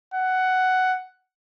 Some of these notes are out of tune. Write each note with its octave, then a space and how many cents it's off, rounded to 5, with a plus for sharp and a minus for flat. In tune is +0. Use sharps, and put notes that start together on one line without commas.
F#5 +10